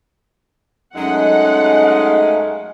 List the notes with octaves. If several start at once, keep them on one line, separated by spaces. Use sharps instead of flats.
F#2 G#3 A3 D#4 F#5 G#5